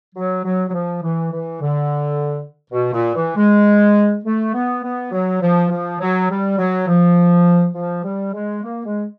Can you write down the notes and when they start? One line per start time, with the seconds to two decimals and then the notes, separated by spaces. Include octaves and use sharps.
0.15 F#3
0.44 F#3
0.69 F#3
0.74 F3
1.02 E3
1.32 E3
1.61 D3
2.71 B2
2.93 A#2
3.15 E3
3.36 G#3
4.24 A3
4.54 B3
4.83 B3
5.12 F#3
5.41 F3
5.70 F3
6.00 F#3
6.29 G3
6.58 F#3
6.87 F3
7.75 F3
8.04 G3
8.33 G#3
8.63 A#3
8.85 G#3